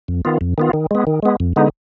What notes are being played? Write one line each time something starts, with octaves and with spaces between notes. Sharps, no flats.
F2
D#3 B3 F4
F2
D#3 B3 F4
D#3
G#3 B3
D#3
G#3 B3
F2
D3 G#3 B3 D#4